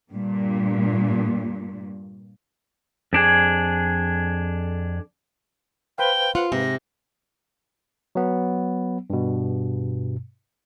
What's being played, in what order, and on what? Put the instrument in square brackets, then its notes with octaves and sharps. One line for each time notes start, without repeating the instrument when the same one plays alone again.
[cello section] G2 A#2
[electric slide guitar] F2 D4 G#4
[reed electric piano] B4 C5 F5 [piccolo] G5
[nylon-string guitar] F4 [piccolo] F#5
[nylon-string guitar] G#2 [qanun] C3 [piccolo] A#6
[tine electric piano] F#3 B3
G2 B2